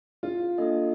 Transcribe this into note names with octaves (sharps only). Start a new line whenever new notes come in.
F4
A#3 D4 A4 D#5